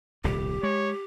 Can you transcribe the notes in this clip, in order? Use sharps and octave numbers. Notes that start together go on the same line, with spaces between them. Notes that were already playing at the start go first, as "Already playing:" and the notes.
D#1 C2 A2 G4
G#3 C#5